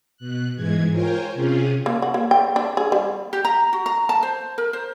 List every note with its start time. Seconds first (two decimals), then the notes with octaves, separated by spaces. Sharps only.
0.17 B2 F#6
0.56 G#2 E3 G#3 G#6
0.91 F4 A#4 C5 C#5 G5 G#5
1.34 C3 C#4 F4 G#4
1.86 A#3
2.02 F#4
2.14 A#3
2.31 G5
2.56 D4
2.77 G#4
2.92 G3
3.33 G4
3.45 A#5
3.73 F#4
3.86 A#5
4.09 A5
4.23 C5
4.58 A#4
4.73 C5